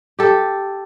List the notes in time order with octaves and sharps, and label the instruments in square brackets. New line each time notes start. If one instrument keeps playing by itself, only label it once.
[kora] G4 A4